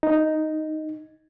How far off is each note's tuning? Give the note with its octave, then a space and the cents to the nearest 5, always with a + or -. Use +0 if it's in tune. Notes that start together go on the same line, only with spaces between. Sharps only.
D#4 +0